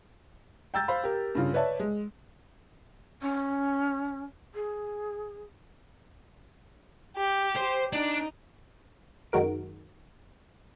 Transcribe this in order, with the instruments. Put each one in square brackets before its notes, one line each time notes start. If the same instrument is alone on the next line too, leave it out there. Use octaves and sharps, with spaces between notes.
[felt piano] G5 A#5 E6 G6 A6
C5 F5 B5
G4 A#4
G2 C#3 F4
B4 C#5 D5 E5 A5
G#3
[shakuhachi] C#4
G#4
[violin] G4
[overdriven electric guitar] C5
[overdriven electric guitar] D4 [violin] D#4
[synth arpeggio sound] F#2 D#3 G#3 F#4 A#4 D7